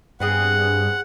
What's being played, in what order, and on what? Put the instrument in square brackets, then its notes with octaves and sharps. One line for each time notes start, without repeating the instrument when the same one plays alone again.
[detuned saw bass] G2 [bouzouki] B3 C4 G#4 [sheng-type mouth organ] F#5